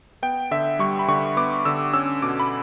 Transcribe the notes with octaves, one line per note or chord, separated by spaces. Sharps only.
B3 G5
D3 E5
G3 C#6
B5
D3 C#6
B3 D6
D3 E6
C#4 E6
B2 D6
B5